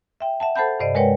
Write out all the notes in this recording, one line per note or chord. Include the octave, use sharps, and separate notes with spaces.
E5 G5
E5 F#5 A5
A4 C5 F#5 A5 B5 G6
G2 C3 C5 D5 D#5
G#3 A#4 B4 C#5 F#5 G5